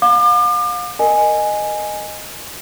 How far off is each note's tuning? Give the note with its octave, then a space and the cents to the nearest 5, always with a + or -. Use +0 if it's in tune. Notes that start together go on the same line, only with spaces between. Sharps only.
F5 +40 D6 +40
A#4 +0 D#5 -10 G#5 +0